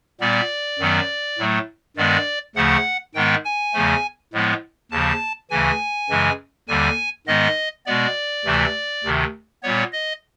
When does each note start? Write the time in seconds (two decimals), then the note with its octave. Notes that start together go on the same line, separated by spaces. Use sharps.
0.20 A#2 G3 B3 D5
0.79 F#2 D#3 F#3 B3
1.38 A2 F#3 A3
1.96 G2 D#3 G#3 B3 D5
2.56 D2 C#3 F3 A3 F#5
3.15 G#2 D#3 G#3 B3 G5
3.45 G#5
3.74 E2 C#3 F3 A3
4.33 A2 F3 G#3 B3
4.91 D#2 C#3 F3 A5
5.50 D2 C#3 E3 G#5
6.10 F#2 C#3 E3 G#3
6.68 D#2 D3 G3 G#5
7.27 G#2 D#3 G#3 B3 D#5
7.86 B2 G#3 B3 D5
8.45 D2 C3 E3 A3
9.04 D2 C3 D#3
9.63 A#2 G3 B3 C#5
9.93 D#5